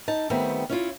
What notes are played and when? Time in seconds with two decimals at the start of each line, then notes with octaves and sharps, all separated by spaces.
0.08 D#4 A5
0.30 D#3 G3 A3 B3 C4
0.70 C#4 E4 F4